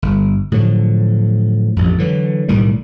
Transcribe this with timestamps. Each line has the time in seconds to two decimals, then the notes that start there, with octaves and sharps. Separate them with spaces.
0.02 G1
0.52 A2 D3 F3 F#3
1.76 A1 F2
1.98 D3 E3 F#3
2.48 B1 A2 D#3 G3